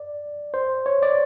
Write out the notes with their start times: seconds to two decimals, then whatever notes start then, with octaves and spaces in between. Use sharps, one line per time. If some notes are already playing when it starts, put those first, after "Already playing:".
Already playing: D5
0.54 C5
0.86 C#5
1.02 D5